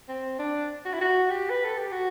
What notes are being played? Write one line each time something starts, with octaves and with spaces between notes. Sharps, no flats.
C4
D4
F#4
E4
F#4
G4
B4
A4
G4
F#4